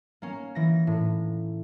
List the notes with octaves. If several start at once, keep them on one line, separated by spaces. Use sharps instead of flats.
A#3 C#4
E3 A#6
A2